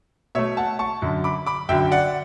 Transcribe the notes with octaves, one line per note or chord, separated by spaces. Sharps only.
B2 A3 C#5 E5
F#5 A5
A5 C#6
F#2 D3 F#3
B5 D6
B5 D6
F#2 D3 F#3 E5 G5
D5 F#5